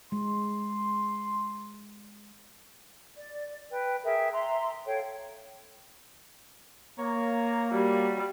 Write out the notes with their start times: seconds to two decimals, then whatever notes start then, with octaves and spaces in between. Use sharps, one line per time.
0.12 G#3 C6
3.17 D5
3.71 B4 G5
4.04 G#4 A#4 E5 G5
4.32 E5 A#5 C6
4.85 A4 C#5 F5 G5
6.99 A#3 C#5 A#5
7.72 G3 F#4